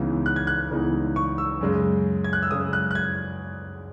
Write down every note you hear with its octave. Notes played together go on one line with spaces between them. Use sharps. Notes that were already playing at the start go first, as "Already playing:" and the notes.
Already playing: C#2 C#3 E3 B3 D#4
F#6
G#6
F#6
C#2 C#3 E3 B3 D#4
C#6
E6
F#2 C#3 G#3
G#6
F#6
E6
F#2 C#3 G#3 D#6
F#6
F#6
G#6